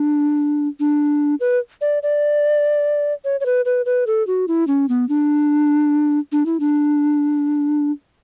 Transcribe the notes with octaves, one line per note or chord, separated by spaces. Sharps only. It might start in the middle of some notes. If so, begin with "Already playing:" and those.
Already playing: D4
D4
B4
D5
D5
C#5
C#5
B4
B4
B4
A4
F#4
E4
C#4
B3
D4
D4
E4
D4